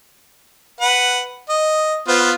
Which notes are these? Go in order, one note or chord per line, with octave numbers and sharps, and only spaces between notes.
B4 F#5
D#5
B3 F4 C5